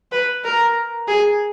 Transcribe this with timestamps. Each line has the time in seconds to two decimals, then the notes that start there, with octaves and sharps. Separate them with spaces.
0.12 B4
0.44 A#4
1.08 G#4